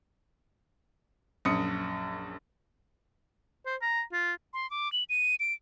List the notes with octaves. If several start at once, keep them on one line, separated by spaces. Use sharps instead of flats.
A#1 F#2 D#6 C#7
C5
A#5
F4
C6
D6
F#7
D#7
D7